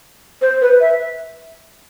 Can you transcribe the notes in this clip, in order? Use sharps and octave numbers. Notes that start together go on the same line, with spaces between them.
C5
B4
E5